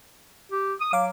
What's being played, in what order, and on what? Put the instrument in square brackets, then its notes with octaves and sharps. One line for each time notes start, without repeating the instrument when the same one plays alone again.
[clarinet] G4
D#6
[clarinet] F#3 [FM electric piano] F5 D6